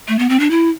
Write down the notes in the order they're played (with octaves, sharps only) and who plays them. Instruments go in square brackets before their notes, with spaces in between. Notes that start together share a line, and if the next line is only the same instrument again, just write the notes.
[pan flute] A3
B3
C4
D4
E4